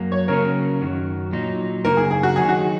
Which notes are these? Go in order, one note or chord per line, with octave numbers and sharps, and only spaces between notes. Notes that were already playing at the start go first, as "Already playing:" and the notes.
Already playing: F#2 F#3 A#3
C#5
C#3 F#3 A#3 C#4 A#4
F#2 D#3 F#3
A#2 F#3 D#4
F#2 C#3 A#3 D#4 A#4
G#4
G#4
F#4
D#3 F#3 D#4 G#4
F#4